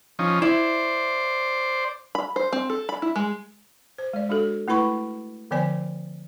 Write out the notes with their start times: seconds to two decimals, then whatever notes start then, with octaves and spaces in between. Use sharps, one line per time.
0.19 F3 C#4 D#4
0.42 E4 C5 D5
2.15 B5
2.36 C5
2.53 C4
2.70 A4
2.89 B5
3.02 E4
3.16 G#3
3.98 C5
4.13 G#3 D5
4.29 G#3 D4 F#4 A4
4.68 A3 E4 B4 B5 C#6
5.51 D3 F3 B3 C5 D5 G#5